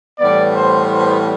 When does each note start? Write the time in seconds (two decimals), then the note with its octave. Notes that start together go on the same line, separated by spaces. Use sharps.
0.19 A2 E3 G3 B3 D5
0.55 C5
0.91 C5